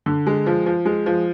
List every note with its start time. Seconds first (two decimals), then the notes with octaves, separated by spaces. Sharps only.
0.06 D3
0.27 G#3
0.46 F3
0.66 F3
0.85 G#3
1.06 F3